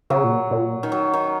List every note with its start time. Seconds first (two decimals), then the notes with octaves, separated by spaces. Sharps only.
0.10 C#3 F#3
0.24 A#2
0.51 A#2
0.83 D#3
0.92 F#3
1.13 D#3